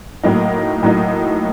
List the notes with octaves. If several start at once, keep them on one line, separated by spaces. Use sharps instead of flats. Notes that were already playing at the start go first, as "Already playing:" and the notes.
A2 F#3 A#3 D#4
A2 F#3 A#3 D#4